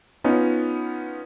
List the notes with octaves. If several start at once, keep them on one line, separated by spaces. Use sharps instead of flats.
B3 C#4 D#4 F4